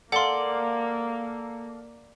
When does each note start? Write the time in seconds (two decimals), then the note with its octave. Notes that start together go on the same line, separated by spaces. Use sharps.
0.12 A#3 A4 D5 F5 F#5 C6